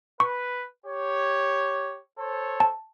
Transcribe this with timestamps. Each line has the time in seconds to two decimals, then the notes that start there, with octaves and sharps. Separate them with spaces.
0.20 B4 C#6
0.86 G4 C#5
2.19 A4 C5 C#5
2.60 A5